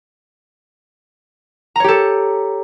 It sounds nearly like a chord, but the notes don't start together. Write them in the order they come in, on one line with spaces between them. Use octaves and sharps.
A#5 C#5 G4 A4